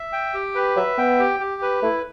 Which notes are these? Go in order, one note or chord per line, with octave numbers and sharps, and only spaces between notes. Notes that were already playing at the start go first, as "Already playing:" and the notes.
Already playing: E5
G5
G4
B4
F#3 E5
B3 G5
G4
G4
B4
A3 E4